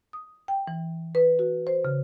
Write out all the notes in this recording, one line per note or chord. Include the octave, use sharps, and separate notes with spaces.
D#6
G5
E3
B4
F#4
C5
C#3